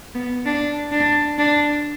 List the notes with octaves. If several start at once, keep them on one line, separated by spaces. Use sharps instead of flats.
B3
D4
D4
D4